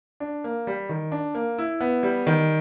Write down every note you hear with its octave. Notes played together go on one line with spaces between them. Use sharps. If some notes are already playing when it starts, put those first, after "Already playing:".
D4
A#3
G3
D#3
D4
A#3
E4
B3
G3
D#3